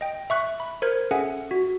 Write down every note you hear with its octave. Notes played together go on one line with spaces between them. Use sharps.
D#5 G5
E5 C#6 F#6
B5
A#4 C5 F6 G#6
C#4 G#4 A4 E5 F#5 G#5
F#4